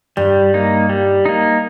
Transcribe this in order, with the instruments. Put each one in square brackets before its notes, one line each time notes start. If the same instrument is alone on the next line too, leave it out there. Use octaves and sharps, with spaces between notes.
[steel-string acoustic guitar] G2 [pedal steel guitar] G3
[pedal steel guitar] A#3 D#4
G3
A#3 D#4